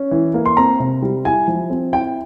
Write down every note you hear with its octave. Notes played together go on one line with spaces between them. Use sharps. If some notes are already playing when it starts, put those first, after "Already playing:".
Already playing: C#4
E3
A#3
C6
C4 A#5
C3
G3
E4 G#5
F3
C4
E4 G5